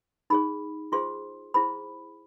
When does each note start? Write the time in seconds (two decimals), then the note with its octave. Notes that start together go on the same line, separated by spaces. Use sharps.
0.30 D#4 G#4 C#5 B5
0.92 F4 G#4 C5 C6
1.54 E4 G#4 C5 B5